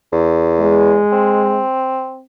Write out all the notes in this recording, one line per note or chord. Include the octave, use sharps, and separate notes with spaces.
E2
G#3
C4